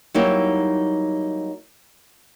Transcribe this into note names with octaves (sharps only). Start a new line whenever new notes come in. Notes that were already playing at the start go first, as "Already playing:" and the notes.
F#3 G3 A#3 D#4 E4